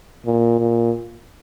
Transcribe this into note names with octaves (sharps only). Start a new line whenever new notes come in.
A#2
A#2